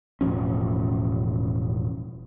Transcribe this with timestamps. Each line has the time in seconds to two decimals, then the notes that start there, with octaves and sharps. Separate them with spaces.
0.21 E1 A2 F3 C#4